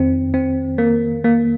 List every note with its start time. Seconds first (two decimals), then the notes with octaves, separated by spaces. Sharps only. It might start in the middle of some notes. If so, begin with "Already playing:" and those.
Already playing: F2 D#3 C4
0.34 C4
0.78 A#3
1.24 A#3